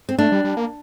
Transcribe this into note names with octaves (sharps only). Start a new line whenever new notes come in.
C4
A3 D4
G3
G3
A#3